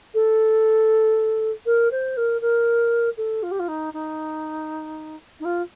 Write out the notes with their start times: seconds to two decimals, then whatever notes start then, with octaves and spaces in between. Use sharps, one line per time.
0.14 A4
1.66 A#4
1.91 C5
2.17 A#4
2.41 A#4
3.17 A4
3.43 F4
3.51 G4
3.59 F4
3.68 D#4
3.94 D#4
5.40 D#4
5.45 F4